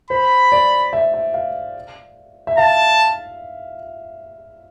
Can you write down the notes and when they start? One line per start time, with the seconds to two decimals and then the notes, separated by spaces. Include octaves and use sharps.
0.10 C5 B5
0.52 D5
0.93 E5
1.14 E5
1.34 F5
2.47 E5
2.58 F5 A5